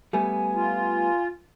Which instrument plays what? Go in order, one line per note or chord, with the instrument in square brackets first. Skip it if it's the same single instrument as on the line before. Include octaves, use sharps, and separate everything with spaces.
[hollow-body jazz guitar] G3 A3 B3 [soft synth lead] G#5
[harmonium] F4